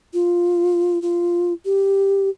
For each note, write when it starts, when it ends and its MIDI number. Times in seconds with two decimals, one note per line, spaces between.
0.14 1.01 65
1.02 1.53 65
1.65 2.30 67